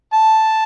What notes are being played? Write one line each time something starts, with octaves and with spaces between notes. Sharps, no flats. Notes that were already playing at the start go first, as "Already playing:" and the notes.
A5